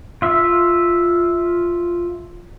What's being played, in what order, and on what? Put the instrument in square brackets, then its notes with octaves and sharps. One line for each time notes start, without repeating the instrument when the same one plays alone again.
[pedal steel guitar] F4 E5